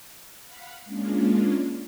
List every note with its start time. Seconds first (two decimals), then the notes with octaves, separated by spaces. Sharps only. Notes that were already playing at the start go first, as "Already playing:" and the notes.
0.45 F5 F#5 B5
0.85 G#3 A#3 C#4 D4 F4